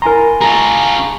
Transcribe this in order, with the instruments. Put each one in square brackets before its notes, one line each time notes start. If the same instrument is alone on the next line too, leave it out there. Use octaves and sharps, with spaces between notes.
[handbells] E4 G#5 C6 [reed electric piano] A#4 A#5
[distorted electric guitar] F4 G#4 [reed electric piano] A5 A#5